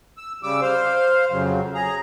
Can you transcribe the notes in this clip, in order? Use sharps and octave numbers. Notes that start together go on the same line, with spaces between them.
E6
C#3 G3 D6 E6
C5 F5
F2 C#3 F#3
G#4 A#5